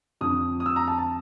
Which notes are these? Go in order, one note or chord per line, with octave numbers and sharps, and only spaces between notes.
F2 D3 D#6
D#6
E6
A#5
A5
A5